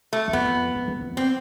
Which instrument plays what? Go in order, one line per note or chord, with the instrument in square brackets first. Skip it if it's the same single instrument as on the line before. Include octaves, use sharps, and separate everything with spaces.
[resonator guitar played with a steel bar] A3
[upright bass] E2
[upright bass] F2 [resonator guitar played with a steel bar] B3
[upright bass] F2
F#2
F2
[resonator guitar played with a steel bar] C4